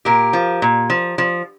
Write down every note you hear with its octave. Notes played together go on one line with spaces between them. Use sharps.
A#2 G4 A#4
F3
A#2
F3
F3